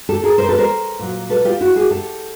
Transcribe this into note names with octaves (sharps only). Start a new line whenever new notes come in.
G4 A4
G#4 A#4
A#4 C5
A4 B4
A#4 C5
A#2 F#3
A4 B4
F4 G4
E4 F#4
F#4 G#4
G4 A4